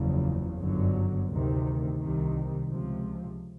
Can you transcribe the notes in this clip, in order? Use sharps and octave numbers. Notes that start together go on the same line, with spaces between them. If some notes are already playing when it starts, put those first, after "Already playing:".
Already playing: F#1 E2 C#3 F3
G1 F#2 D3 F#3
D2 C3 D#3
C2 C3 D#3
C#2 C3 F3